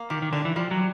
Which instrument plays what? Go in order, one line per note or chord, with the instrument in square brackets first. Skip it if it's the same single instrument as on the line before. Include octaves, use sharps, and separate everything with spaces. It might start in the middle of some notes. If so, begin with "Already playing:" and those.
Already playing: [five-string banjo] A#3
[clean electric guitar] D#3 [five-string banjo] G4
[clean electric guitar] D#3
[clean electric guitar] D3 [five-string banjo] D4
[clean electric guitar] E3
[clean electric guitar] F3 [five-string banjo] G3
[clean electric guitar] F#3